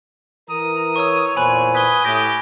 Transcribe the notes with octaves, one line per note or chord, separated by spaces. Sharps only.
E3 A#4 A#5 D#6
C#5 C#6 E6
E2 A#2 C5 G#5 B5 F#6
B4 D#6 G#6 G7
A2 G4 A#6